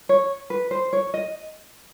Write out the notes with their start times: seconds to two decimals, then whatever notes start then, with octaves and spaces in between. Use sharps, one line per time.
0.09 C#5
0.50 B4
0.71 C5
0.93 C#5
1.14 D#5